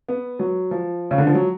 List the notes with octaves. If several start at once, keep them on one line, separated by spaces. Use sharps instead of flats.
B3
F#3
F3
C#3
D3
F3
F#3